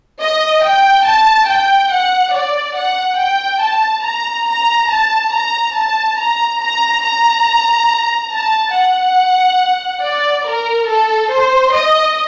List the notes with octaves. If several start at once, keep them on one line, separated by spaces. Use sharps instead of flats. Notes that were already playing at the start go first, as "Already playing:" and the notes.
D#5
G5
A5
G5
F#5
D5
F#5
G5
A5
A#5
A#5
A5
A#5
A5
A#5
A#5
A#5
A5
F#5
D5
A#4
A4
C5
D#5